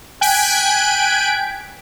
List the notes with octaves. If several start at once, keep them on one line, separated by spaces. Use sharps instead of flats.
G5 G#5 F#6 G#6 B6 D7